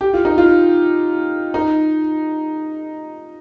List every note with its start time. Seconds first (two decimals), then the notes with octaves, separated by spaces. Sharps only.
0.01 G4
0.13 F4
0.25 D#4
0.38 F4
1.54 D#4